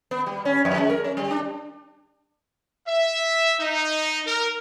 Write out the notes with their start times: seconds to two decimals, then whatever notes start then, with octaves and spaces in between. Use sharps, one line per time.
0.11 B3
0.26 G3
0.45 C#4
0.65 F2
0.78 G#3
0.90 A#4
1.04 C#4
1.17 G3
1.31 D4
2.87 E5
3.60 D#4
4.26 A#4